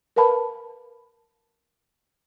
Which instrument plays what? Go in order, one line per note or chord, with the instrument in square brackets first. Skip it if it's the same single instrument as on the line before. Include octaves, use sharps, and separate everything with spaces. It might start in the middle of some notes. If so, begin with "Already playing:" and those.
[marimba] A#4 B4 F5 A5 B5